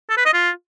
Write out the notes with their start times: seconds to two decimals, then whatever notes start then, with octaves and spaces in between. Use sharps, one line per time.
0.10 A4
0.18 B4
0.25 D#5
0.33 F4